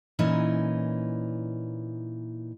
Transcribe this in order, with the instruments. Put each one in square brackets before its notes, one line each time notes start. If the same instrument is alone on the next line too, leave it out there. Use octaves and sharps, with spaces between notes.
[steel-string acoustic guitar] A#2 E3 C#4 D#4